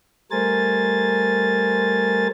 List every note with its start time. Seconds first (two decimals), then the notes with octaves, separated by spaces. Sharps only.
0.31 G3 A3 A#4 C5 G#5 A6